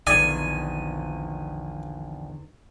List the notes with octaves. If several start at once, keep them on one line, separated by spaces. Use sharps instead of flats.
A#1 E2 D3 D#3 D5 G#5